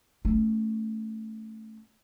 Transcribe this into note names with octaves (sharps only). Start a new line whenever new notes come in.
A3 C#4